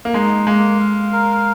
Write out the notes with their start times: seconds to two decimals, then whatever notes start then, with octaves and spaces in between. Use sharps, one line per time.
0.05 A#3
0.14 G#3 D#4
0.46 G#3 A#3
0.80 F5
1.12 A#4